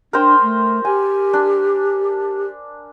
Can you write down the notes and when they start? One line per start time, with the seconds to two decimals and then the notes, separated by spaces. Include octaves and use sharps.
0.13 D4 A#4 C5 G5
0.42 A3
0.85 G4 G#5
1.33 D4